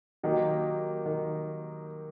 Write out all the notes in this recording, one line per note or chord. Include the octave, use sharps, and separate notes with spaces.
D#3 F#3 A#3 D#4 G4
D#3